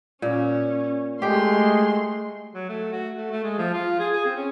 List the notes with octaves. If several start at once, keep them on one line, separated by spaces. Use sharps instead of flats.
A#2 C#4
G#3 A3 G4 G5 C6
F#3
A3
F#4
A3
A3
G#3
F3
F4
G#4
G#4
C4
C#4